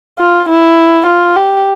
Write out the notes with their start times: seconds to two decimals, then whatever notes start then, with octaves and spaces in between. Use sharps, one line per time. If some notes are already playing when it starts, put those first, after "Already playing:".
0.19 F4
0.49 E4
1.07 F4
1.36 G4